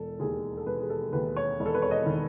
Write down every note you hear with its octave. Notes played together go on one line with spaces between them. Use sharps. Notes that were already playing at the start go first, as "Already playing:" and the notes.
Already playing: E1 A4
D#2 D#3 G#4
A4
E1 B4
G#4
A4
D#2 D#3 B4
C#5
E1
A4
B4
C#5
D#5
D#3